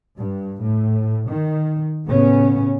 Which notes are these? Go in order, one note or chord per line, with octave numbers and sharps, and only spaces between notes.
G2
A2
D#3
A2 C#3 B3 C#4